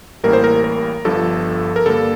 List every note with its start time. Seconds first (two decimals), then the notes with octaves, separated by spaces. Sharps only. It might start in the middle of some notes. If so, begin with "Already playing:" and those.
0.24 A1 A2 G3 A#3 A#4
0.33 C5
0.44 A#4
0.64 A#4
1.05 G1 G2 F3 A4
1.76 A#4
1.86 G2 D3 G3 A#3 A4